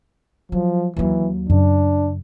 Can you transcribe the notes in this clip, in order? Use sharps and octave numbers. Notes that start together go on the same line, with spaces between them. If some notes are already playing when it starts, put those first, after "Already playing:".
F3 F#3
D#2 E3 F#3
F#2 C#3 D4